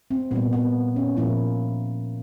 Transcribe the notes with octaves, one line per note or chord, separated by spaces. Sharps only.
C4
A#2 G3 A#3 B3
B3
C#4
A#2 F3 A#3 E4